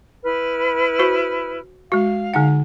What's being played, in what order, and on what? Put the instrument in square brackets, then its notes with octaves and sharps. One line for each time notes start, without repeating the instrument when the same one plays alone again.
[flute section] E4 B4 F6
[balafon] F#4 C5
[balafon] G#3 F#4 [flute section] F5
[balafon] D3 D#4 F#5